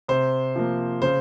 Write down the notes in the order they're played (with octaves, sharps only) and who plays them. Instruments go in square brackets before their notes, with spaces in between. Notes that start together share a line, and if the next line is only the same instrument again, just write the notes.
[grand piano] C3 C5
F3 A#3
C#3 C5